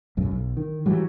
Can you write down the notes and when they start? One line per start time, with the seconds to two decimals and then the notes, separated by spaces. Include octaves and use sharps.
0.17 B1 F#2
0.31 B1
0.57 D#3
0.86 E3 F#3 G3